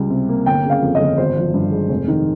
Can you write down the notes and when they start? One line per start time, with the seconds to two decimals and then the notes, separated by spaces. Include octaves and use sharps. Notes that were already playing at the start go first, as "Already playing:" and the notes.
Already playing: C#2 G3
0.10 C3
0.29 A#3
0.46 G1 G5
0.65 C#3 F5
0.82 F2
0.95 D#5
1.00 G1
1.18 G#1 C5
1.37 F3
1.54 G2
1.71 G#3
1.89 F1
2.08 D#3